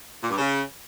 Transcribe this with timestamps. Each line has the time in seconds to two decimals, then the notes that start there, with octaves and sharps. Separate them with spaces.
0.22 A#2
0.30 G2
0.38 C#3